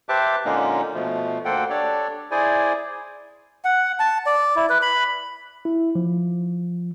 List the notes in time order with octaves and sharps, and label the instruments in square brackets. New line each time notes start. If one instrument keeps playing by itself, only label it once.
[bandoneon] G4 B4 C5 E5 A5 D6
A#2 D3 G#3 A#3 C#4 D#4
B2 F3 A3
D2 A#3 A4 C5 F#5 G5
D4 G4 A4 C#5 D5
E4 G#4 C5 D5 G#5
[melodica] F#5
A5
D5
E4
B4
B5
[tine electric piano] E4
F3